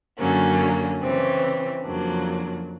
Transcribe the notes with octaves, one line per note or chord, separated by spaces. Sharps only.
F#2 D3 F#3 A#3 C#4
C#3 E3 G3 C4
F2 C#3 F#3 A#3 D4